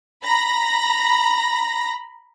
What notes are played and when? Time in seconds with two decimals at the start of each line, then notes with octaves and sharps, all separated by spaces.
0.24 A#5 B5 A#6